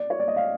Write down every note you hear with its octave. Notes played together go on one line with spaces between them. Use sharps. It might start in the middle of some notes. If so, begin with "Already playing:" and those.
Already playing: D5
C#5
D5
D#5
F5